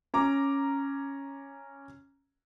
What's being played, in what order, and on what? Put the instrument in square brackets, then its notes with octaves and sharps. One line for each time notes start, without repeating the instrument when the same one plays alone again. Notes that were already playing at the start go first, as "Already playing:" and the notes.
[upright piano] C#4 A#5 D6